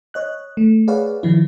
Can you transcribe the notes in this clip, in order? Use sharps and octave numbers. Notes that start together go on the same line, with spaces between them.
C#5 D#5 F#6
A3
G#4 B4 C#5 D5 F5 F#5
D#3 F3 E4